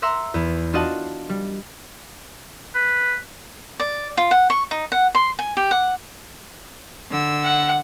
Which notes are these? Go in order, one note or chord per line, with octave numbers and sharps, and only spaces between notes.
E5 F#5 A#5 C6 E6
E2 B3
D4 F4 F#4 D#5 F#5 A5
G3
B4
D5
F4
F#5
C#6
D#4
F#5
C6
G#5
G4
F#5
D3 E6
F#5